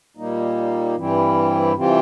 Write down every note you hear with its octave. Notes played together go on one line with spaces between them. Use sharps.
A#2 G3 A#3 D#4
G2 E3 G3 C4 E4
C3 E3 G3 C4 F4